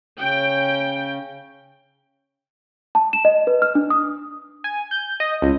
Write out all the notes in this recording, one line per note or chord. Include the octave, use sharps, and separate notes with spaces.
C#3 C#4 G5
A5
E7
D#5
B4
F6
D4
D#6
G#5
G6
D#5
C#2